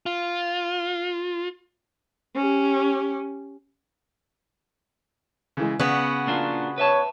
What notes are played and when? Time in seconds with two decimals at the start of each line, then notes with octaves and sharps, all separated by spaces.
0.06 F4
2.36 C#4 G4
5.57 C#3 E3 G#3
5.80 C#3 B3 F#4
6.27 A#3 D4 F4
6.78 B4 C#5 E5 A5